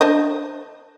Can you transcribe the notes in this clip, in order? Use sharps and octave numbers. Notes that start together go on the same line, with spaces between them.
D4 C5 D#5